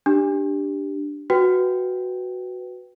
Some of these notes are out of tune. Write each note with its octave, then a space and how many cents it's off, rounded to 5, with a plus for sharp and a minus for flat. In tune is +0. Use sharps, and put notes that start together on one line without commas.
D4 +0 G4 +0
F#4 +0 B4 +0 G5 +0